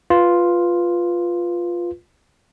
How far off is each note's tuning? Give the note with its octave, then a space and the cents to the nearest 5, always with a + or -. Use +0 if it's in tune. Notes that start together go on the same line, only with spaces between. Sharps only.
F4 +0 B4 +0